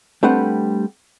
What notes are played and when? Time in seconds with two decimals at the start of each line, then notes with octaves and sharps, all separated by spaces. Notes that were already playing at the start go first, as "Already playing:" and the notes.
0.23 G3 A3 C4 D4 B4 F#5